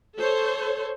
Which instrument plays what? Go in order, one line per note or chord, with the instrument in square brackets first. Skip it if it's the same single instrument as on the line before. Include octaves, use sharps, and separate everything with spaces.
[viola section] A4 C5 C#5